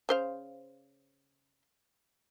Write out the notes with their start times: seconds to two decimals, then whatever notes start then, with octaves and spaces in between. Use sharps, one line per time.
0.09 C#3 C5 F5